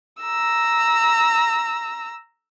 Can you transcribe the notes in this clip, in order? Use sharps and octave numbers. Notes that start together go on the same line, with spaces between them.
A#5 E6